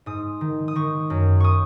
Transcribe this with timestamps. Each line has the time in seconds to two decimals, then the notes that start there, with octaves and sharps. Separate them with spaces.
0.06 G#2 D#6
0.41 D#3
0.68 D#6
0.75 D#3 C#6
1.10 F#2
1.40 C#6 D#6